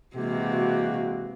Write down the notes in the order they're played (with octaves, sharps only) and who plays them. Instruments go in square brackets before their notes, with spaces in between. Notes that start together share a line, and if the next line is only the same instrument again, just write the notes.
[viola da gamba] C3 [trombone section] E3 F#4 [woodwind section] G#3 A#3